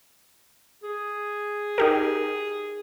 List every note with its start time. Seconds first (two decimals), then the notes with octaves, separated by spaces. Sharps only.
0.83 G#4
1.78 D#4 G4 A#4